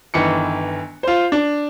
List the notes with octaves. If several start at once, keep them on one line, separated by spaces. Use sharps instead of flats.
G1 D#3 E3 C#7
F4 C5
D4